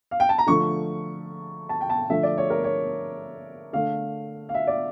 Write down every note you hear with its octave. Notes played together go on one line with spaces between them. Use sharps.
F5
G5
A5
A#5
D3 F3 A3 C#6
A5
G5
A5
D3 F3 A3 E5
D5
C#5
A#4
C#5
D3 A3 F5
F5
E5
D5